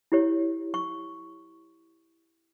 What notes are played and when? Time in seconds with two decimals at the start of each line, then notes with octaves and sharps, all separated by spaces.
0.12 E4 G4 C#5
0.74 C#6